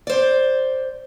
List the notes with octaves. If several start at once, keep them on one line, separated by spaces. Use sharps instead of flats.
C5 D5